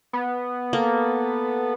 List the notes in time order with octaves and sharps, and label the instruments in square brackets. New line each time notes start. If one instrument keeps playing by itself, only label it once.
[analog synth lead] B3
[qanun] A#3 [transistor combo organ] A4